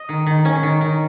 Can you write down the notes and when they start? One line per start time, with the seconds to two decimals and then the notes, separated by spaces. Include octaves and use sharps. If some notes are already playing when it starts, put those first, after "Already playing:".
Already playing: D#5
0.09 D#3
0.26 D#3
0.45 C#4
0.63 D#3
0.81 D#3